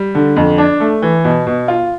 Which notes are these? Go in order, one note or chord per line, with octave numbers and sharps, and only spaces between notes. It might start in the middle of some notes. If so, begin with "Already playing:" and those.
Already playing: G3
D3
F2
D4
A3
E3
B2
B2
F4